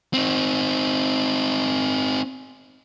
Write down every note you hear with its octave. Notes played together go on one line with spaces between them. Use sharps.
C4 D#4